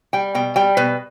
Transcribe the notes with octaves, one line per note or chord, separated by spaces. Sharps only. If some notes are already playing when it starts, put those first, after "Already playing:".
G3 G5
B2 G5
G3 G5
B2 B4